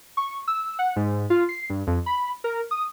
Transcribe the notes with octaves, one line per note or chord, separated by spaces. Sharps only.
C#6
E6
F#5
G#2
F4
C7
G2
F2
B5
A#4
D#6